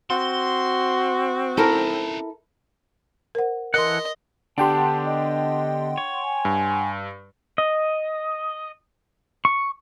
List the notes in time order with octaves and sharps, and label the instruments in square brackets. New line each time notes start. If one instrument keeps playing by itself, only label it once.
[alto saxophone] C4 [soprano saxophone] F#4 [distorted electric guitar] C6
[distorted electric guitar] C#4 D#4 [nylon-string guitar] E4 A4 A#4
[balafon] A#4 C5 F#5
[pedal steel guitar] E3 A4 F#5 [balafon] A#4 C6 [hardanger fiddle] D#5
[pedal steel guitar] D3 B3 [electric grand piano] D4 G4 [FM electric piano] F#5 G5 C6 [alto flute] A5
[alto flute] D#5
[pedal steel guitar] C#5
[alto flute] G#5
[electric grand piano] G2
[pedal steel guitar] D#5
C#6